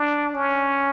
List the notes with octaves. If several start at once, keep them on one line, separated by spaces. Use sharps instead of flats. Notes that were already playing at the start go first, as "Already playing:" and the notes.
Already playing: D4
C#4